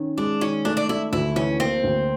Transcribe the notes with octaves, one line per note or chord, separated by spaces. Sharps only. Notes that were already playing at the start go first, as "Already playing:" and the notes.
Already playing: D#3 C#4
G#3 D4
D#3 C#4
A3 D4
D4
A3 E4
D2 E4
E3 C#4
A#3 C4
D2